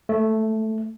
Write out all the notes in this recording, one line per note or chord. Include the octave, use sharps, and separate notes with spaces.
A3